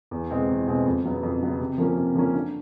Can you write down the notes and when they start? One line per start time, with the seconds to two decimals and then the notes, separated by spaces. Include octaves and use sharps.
0.11 E2
0.30 B2 G#3 C4
0.49 E2
0.68 B2 G#3 C4
0.86 F2
1.04 C#3 F#3 B3
1.23 F2
1.41 C#3 F#3 B3
1.60 C3
1.78 F3 A#3 C#4
1.97 C3
2.15 F3 A#3 C#4
2.35 D3